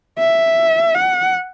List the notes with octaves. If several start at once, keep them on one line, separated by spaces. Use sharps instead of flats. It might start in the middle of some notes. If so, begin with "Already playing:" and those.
E5
F#5